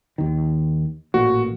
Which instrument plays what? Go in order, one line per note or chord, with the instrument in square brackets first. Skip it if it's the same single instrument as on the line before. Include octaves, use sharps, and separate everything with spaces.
[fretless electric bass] D#2 D#3
[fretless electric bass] A1 A#2 [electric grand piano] F#4